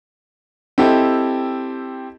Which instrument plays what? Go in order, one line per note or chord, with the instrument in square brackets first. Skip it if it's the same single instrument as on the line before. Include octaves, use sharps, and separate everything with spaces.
[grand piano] C4 E4 G4 A4 D#5